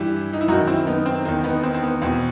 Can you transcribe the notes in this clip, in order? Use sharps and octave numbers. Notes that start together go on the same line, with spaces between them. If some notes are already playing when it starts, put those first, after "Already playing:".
Already playing: G2 E3 E4 G4
D#4
E4
F#2 D#3 D#4 F#4
C4 E4
B3 D#4
C4
E2 D#3 C4
B3 D#4
C4
C4
B3
E2 B2 C4